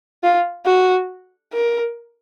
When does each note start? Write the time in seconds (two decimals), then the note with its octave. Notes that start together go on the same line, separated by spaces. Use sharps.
0.23 F4
0.66 F#4
1.53 A#4